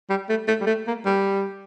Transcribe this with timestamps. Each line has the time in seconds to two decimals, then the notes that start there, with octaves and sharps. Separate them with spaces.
0.10 G3
0.29 A3
0.48 A3
0.61 G3
0.67 A3
0.87 A#3
1.05 G3